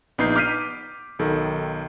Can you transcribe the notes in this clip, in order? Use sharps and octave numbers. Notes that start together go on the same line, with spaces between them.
A#1 B3 D#4 G6 C7
D6 F6 G6 B6 C7 D#7
B1 D#3 A4